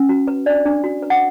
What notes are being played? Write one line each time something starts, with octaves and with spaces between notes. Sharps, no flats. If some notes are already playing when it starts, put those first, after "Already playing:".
Already playing: C#4
F#4
B4
D4 D5
D4
F#4
B4
F#5